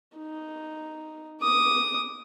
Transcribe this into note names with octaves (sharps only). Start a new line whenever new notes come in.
D#4
D6 D#6